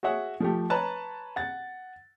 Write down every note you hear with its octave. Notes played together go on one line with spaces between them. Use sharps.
F#4 G#4 C#5 E5 F#5
F3 A3 G4
B4 C#5 A5 A#5 F#6
F#5 A6